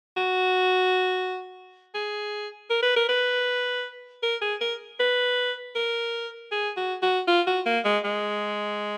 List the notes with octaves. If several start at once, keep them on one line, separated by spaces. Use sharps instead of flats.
F#4
G#4
A#4
B4
A#4
B4
A#4
G#4
A#4
B4
A#4
G#4
F#4
F#4
F4
F#4
A#3
G#3
G#3